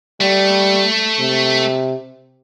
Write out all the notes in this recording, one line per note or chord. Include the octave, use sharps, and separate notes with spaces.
G3 A3
C3